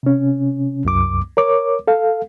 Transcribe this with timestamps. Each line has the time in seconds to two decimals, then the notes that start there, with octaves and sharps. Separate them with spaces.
0.03 C3 C#4
0.85 C2 F#2 D6
1.37 A#4 C#5 D6
1.88 A4 F5